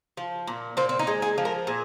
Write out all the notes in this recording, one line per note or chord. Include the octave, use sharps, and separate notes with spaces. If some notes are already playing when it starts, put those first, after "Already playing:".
F3
A#2
A#2 C4
C4
D#4
G#3
G#4
F3
A#4
A#2 G#4